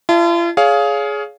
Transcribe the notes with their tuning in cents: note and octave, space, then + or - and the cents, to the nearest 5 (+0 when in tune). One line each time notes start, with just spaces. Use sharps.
F4 -45 D#5 +0 A5 +0
G#4 +15 C#5 +30 F5 +0